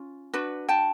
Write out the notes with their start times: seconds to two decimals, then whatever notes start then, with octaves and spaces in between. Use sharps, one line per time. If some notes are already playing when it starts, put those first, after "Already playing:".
Already playing: C#4 F4
0.33 D4 F#4 B4
0.69 G5 A5